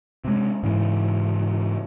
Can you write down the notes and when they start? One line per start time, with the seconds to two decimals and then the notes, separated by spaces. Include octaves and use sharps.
0.24 C3 G#3
0.63 G#2 C#3 E3